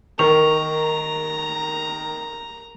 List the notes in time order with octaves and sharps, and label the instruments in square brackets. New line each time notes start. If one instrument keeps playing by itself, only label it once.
[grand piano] D#3 [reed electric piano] A#4 C#6 [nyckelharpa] A#5 [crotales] F7